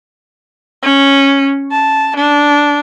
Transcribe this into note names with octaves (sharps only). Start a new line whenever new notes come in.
C#4
A5
D4